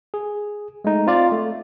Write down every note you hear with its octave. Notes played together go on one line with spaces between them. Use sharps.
G#4
G#3 A3 D#4
C4 F4 D5
A3